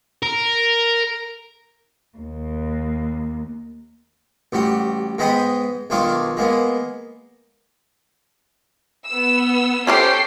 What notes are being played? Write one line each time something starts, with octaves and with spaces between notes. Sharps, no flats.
A#4
D#2
A1 G3 F#4
G#2 G#3 B3 D#5 G5 B5
B1 D#3 D4 F4 C#5 D6
G#3 A#3 B3
B3 E6
C#4 G4 A4 C5 G5 C7